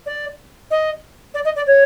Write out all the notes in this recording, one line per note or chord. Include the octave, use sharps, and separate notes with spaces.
D5
D#5
D5
D#5
D5
C#5